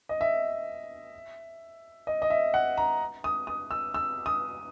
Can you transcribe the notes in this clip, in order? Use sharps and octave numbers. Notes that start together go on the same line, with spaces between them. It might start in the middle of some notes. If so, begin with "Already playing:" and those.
D#5
E5
D#5
D#5
E5
F#5
A#5
D#6
D#6
E6
E6
D#6